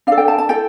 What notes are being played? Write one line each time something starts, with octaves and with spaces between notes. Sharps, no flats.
D4 A4 F5
G5
A5
A5
E4 A4 G5